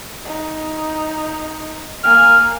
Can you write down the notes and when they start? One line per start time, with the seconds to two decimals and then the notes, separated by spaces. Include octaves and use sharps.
0.25 D#4
2.04 A#3 G#5 F6